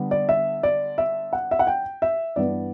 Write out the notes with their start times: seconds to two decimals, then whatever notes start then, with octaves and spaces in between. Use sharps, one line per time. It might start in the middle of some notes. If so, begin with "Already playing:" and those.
Already playing: D3 G3 B3 D4
0.11 D5
0.29 E5
0.63 D5
0.98 E5
1.33 F#5
1.51 E5
1.59 F#5
1.67 G5
2.02 E5
2.36 G2 E3 B3 D4 D5